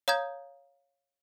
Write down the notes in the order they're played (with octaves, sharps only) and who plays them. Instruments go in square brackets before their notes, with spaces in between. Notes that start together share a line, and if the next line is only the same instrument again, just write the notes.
[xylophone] C#5 F5 A#5 D#6 G6 G#6